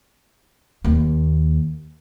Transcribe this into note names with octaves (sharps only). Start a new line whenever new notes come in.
D#2 A#3